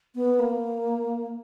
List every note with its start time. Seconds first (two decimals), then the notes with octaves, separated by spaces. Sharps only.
0.15 B3
0.39 A#3